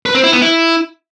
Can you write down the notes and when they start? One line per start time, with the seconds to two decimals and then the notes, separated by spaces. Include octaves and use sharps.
0.06 B4
0.15 C4
0.24 E4
0.33 B3
0.42 E4